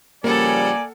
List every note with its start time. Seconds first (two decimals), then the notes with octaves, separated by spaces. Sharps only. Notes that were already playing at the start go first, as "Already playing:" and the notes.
0.24 C#3 F3 G3 A#3 A4 D5 F#5 G#5